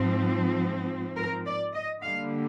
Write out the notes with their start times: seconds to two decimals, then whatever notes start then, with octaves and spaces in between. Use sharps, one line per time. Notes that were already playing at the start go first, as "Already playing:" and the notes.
Already playing: G#2 F3 C4
1.17 A#4
1.46 D5
1.73 D#5
2.03 D3 G3 A#3 F5